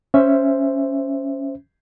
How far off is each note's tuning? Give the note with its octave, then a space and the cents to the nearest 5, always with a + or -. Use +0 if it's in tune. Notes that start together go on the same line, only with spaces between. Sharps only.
C#4 +5 C5 +0 E5 +10